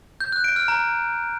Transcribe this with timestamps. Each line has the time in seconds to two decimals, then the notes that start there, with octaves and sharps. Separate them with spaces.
0.20 G6
0.32 F#6
0.44 D7
0.56 F6
0.68 A#5